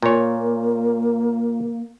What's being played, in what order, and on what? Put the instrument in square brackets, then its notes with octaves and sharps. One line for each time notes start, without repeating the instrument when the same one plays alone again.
[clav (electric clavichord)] A#2 C#5 [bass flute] A#3